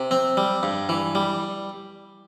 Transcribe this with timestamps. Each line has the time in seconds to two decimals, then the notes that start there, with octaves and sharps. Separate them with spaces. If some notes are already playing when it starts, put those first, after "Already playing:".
Already playing: C3
0.11 C4
0.37 G3
0.63 G2
0.89 E3
1.15 G3